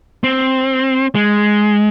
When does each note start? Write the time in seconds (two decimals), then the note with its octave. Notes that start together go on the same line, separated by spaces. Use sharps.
0.24 C4
1.15 G#3